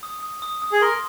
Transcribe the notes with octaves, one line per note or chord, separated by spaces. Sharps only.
D#6
D#6
D#6
D#6
G#4
A#4 C6